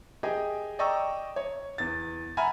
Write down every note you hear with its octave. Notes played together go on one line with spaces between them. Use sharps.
G4 G#4 D#5 G5 G#5
D5 D#5 G5 A#5 C#6 E6
C#5
E2 A6
E5 F#5 G#5 A#5 B5 F6